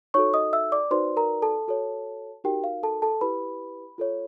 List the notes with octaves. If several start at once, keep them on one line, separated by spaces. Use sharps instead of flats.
D#4 F#4 A4 C#5 C#6
D#5 D#6
E5 E6
D5 D6
D#4 F#4 B4 C5 D5 C6
A#4 A#5
A4 A5
F#4 A4 C#5
D#4 F#4 G4 A#4 G5
F5
A4 A5
A4 A5
E4 G4 B4 B5
F4 A4 C#5